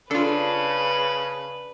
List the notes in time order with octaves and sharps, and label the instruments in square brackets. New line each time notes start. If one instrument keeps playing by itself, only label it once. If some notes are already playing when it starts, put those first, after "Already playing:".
[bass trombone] C#3 [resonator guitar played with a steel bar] D4 [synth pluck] F4 A4 [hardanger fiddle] B4